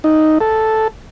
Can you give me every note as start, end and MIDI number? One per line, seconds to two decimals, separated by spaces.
0.04 0.38 63
0.41 0.88 69